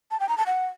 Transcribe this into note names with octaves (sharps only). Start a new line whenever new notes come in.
A5
G5
A#5
A5
F#5